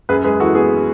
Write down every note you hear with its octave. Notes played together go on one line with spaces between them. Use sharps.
F#2 G#4 B4
G#3 G#4 B4
E3 F#4 A4
B3 G#4